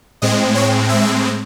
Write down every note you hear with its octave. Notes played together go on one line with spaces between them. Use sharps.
A2 G#3 C4 D#5
C#5
E5